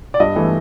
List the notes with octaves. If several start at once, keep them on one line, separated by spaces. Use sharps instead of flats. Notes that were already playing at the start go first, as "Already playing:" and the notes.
D5
G2 D#5
E3 A3